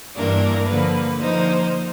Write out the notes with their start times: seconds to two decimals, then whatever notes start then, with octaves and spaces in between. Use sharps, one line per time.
0.16 G2 E3 G3 A#3 D4 A#4
0.68 D3 F3 A#3 B4
1.20 D3 F3 A#3 D#4 C5